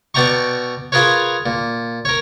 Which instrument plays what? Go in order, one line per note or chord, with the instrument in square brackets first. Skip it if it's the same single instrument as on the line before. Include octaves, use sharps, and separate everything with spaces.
[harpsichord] B2 D5 G5 A#5 C#6
F4 G#4 A#4 B4 C#5
A#2
A#4 C#5